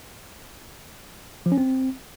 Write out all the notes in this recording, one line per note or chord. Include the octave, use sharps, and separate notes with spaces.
F3
C#4
C4